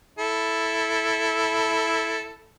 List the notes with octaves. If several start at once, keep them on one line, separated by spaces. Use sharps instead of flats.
E4 A4